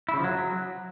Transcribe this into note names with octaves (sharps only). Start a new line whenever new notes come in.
E4
C#3
F3
F#3